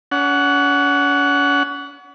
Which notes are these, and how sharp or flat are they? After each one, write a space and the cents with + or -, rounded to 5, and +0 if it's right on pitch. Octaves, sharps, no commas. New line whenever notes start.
C#4 +40 F#5 +0